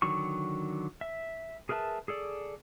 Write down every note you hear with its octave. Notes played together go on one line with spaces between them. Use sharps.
D3 D#3 F#3 C#6
E5
G#4 A#4 B4 E5 A5
G#4 A4 D5